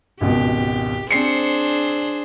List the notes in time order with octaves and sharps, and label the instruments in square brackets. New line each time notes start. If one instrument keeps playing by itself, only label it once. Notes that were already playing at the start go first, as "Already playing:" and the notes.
[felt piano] G#1 C#2 B2 [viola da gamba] G4
[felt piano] C4 C7 C#7 [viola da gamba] D4 G#4 C5